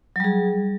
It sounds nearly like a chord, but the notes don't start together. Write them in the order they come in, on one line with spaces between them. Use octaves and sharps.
F#3 G3 G#4